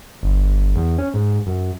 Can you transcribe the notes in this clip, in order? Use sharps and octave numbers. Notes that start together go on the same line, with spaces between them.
G1
E2
C#4
G#2
F#2